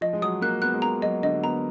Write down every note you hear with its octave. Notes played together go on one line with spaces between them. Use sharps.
F3 D#5
G#3
F#3 D#6
A#3 F#6
B3 F#6
G#3
A#3 A#5
F#3 D#5
D3 D#5
B3 A#5